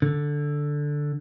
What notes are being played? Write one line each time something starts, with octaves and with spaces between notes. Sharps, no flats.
D3